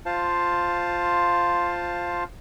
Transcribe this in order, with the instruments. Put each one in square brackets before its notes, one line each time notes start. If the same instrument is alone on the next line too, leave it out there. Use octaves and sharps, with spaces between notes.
[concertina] F4 C5 F5 A5